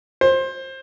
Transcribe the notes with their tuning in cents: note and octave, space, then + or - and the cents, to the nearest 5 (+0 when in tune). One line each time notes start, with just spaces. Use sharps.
C5 +20